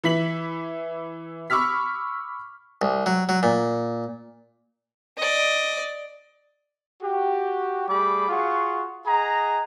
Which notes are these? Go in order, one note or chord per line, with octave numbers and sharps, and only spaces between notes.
E3 E4 B6 F#7
B5 C#6 D6 E6 F6 B6
C2
F#3
F#3
A#2
D5 D#5
F#4 G4
G3 A3 G4 G#4 B5 D6
F4 F#4 G#4 F5 F#5 C#6
G#4 D#5 F#5 A#5